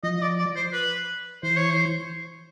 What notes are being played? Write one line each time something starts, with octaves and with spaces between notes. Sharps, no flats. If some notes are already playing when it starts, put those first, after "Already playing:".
F3 D#5
D#5
D5
D5
C5
B4
E3 C5
C#5
C5